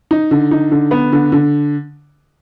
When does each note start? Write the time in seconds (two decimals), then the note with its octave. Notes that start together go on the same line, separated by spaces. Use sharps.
0.11 D#4
0.31 D3
0.51 D#4
0.71 D3
0.91 B3
1.12 D3
1.32 D3